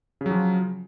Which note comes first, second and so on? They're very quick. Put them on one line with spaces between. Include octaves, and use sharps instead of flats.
C#3 F#3 F3